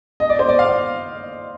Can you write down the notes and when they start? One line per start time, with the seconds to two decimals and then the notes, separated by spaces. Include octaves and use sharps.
0.20 D#5
0.29 D5
0.39 C5
0.49 D5
0.59 F5